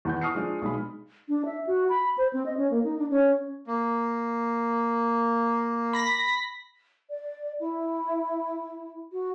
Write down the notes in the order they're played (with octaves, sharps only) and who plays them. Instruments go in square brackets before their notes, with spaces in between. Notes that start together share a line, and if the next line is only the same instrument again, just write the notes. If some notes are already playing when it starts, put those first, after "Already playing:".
[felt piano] E2 F#5 G6
C#6 D#6 F6 C7 C#7
F3 G#3 D4
B1 G#3 B5
[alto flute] D4
E5
F#4
B5
C5
C4
D#5
C#4
A#3
D#4
D4
C#4
[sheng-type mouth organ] A#3
[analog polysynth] B5 A#6 B6
[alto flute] D5
E4
F#4